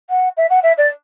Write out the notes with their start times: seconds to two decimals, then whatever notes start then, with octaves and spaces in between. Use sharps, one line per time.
0.10 F#5
0.37 E5
0.50 F#5
0.63 E5
0.77 D5